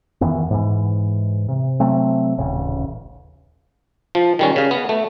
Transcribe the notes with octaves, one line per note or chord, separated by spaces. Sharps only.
F2 D#3 E3 B3
G#2 E3
C3
C3 F#3 A3 C4
D#1 A1 C#3
F3
D#3 G3 C#4
C#3 F5
B3
A3